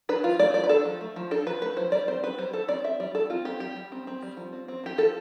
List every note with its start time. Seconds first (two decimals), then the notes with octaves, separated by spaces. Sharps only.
0.09 D4 B4
0.23 F3 F4
0.39 A3 D5
0.54 F3 D5
0.64 B4
0.69 D4 A4
0.85 F3
1.01 A3
1.16 F3
1.31 D4 A4
1.47 F3 B4
1.62 A3 B4
1.77 F3 C5
1.92 G3 D5
2.08 C4 C5
2.23 C4 B4
2.38 G3 C5
2.53 G3 A4
2.68 C4 D5
2.84 C4 E5
3.00 G3 D5
3.15 G3 A4
3.30 C4 F4
3.45 C4 G4
3.60 G3 G4
3.76 G3
3.92 C4
4.07 C4
4.22 G3
4.37 F3
4.53 C4
4.68 C4
4.84 F3 G4
4.98 F3 A4